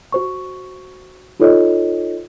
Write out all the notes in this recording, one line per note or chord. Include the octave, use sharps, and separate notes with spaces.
F#4 C5 C#6
D#4 F4 A4 C5 C#5 D#5